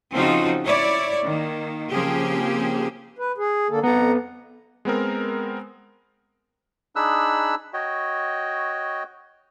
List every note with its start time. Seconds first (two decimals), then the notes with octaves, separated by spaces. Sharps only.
0.14 C#3 F3 C4 D#4 F4 F#4
0.65 E4 C#5 D5
1.25 D#3 A#3
1.92 C#3 F3 A#3 C4 G4 G#4
3.18 B4
3.38 G#4
3.70 D3 A#3 A4
3.84 F2 B3 A4 F#5 A#5
4.85 G#3 B3 C4 A#4
6.96 D4 D#4 G#4 B5 E6 F#6
7.73 F#4 C#5 D#5 G5